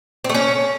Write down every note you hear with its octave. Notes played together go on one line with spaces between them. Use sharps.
C4
A3
C#4